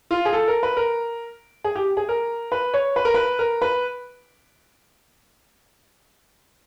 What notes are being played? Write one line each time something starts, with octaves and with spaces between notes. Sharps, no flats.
F4
G#4
A4
A#4
B4
A#4
G#4
G4
G#4
A#4
B4
C#5
B4
A#4
B4
A#4
B4